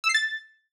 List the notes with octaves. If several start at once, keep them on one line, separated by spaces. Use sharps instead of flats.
E6
C7
A6